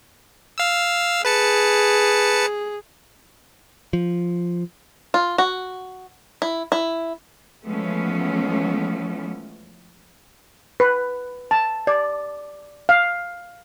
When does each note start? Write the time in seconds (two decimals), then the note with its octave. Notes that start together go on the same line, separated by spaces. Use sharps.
0.58 F5 E6
1.25 G#4 B4 A5 C#7
3.93 F3
5.14 F4
5.38 F#4
6.42 E4
6.72 E4
7.65 E3 F3 G#3 A3 B3 C#4
10.80 B4
11.51 A5
11.87 D5
12.89 F5